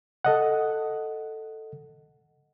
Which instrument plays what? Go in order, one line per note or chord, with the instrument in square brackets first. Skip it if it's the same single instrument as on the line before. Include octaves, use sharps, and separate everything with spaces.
[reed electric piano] A4 D#5 F#5